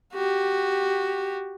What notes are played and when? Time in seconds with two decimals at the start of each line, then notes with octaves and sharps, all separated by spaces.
0.14 F#4 G4